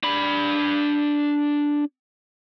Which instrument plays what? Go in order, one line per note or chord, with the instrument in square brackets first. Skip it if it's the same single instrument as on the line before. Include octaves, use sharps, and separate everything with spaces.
[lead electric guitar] D4 B5